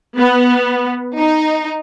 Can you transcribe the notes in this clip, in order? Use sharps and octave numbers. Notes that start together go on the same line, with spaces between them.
B3
D#4